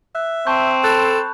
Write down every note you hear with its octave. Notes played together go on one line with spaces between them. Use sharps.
E5 F#6
C4 A5 C#6 G6
A4 B5 F#6